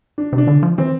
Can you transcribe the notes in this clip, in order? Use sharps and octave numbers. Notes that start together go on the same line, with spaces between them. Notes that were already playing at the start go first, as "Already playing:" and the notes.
D4
C3
D4
D3
F3
E3 C4